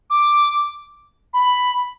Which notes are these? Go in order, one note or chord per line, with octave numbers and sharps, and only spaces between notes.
D6
B5